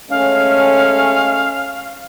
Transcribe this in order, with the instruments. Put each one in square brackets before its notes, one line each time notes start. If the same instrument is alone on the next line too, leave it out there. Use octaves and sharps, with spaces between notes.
[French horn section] G#3 A3 C#4 [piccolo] F5